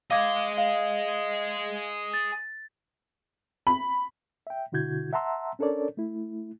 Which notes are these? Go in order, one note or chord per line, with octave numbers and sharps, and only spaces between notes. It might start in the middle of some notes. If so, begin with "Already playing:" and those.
G#4 D#5 F5 D6 G#6
F5
A6
B5
E5 G5
B2 D3 E4 F#4 G6 G#6
E5 F#5 A5 A#5 C6 E6
C#4 D4 A4 A#4 C#5 D5
A3 E4